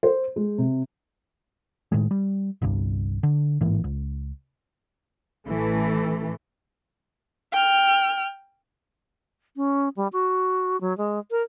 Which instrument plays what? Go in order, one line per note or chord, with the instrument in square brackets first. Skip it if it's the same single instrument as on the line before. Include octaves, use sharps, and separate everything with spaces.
[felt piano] C5
G#3
C3
[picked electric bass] A2 D#3 G#3
G3
G1 C2 G2
D3
A1 G#2 E3 A#3
C#2
[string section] A1 E3 A3
[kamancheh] G5 F6
[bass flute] C#4
G3
F#4
F#3
G#3
A#4